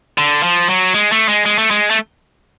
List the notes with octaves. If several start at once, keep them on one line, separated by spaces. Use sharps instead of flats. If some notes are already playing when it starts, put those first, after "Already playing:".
D3
F3
F#3
G#3
A3
G#3
G#3
A3
G#3
A3